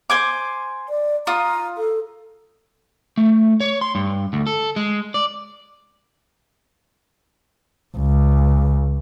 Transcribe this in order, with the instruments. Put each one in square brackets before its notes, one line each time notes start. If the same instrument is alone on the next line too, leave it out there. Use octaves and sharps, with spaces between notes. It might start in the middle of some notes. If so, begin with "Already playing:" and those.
[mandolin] C5 G#5 D6
[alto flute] D5
[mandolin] F4 D#6 [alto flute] A#5
[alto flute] A4
[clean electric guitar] A3
C#5
C6
G2
D2
A4
G#3
D5
[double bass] C#2